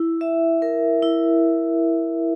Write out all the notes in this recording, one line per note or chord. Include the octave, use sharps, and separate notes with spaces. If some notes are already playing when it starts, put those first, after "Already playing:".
Already playing: E4
E5
A#4
E4